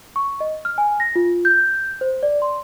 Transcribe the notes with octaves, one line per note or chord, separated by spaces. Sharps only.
C#6
D#5
F6
G#5
A#6
F4
G6
C5
D5
C6